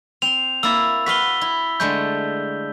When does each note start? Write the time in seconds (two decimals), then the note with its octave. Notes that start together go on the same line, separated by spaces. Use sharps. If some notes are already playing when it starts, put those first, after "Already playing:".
0.22 C4 C6 F7
0.63 A#3 E4 E5 E6 A6
1.06 F#4 B4 F5 B6 G7
1.41 E4
1.80 D3 G#3 A3 B5 G6